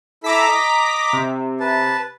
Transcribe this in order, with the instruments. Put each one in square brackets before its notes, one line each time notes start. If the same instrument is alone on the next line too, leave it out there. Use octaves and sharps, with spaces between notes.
[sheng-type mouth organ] E4 A4 E6 [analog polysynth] A#5 D6 B6
[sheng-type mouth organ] D#5
[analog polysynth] C3
[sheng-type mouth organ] B4 A5